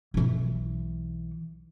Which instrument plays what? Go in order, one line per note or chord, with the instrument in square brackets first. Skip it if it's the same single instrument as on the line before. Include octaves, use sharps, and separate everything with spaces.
[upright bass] B1 E3